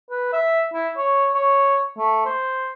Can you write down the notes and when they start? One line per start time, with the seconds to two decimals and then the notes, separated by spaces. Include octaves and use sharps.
0.10 B4
0.33 E5
0.73 E4
0.97 C#5
1.34 C#5
1.98 A3
2.26 C5